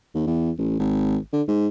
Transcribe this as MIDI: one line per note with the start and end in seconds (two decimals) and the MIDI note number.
0.15 0.27 39
0.27 0.51 40
0.58 0.76 33
0.79 1.17 32
1.33 1.42 50
1.48 1.67 44